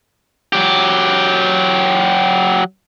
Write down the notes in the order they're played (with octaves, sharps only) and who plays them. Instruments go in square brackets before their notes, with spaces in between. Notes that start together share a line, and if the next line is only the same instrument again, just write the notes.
[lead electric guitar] F#3 G4